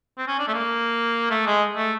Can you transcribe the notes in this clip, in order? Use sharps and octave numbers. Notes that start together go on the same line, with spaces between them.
C4
C#4
D4
A3
A#3
A3
G#3
A3